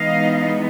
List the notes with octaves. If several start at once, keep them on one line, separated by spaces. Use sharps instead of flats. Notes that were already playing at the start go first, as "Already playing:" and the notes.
Already playing: E3 G#3 B3 D#4 D#5 F5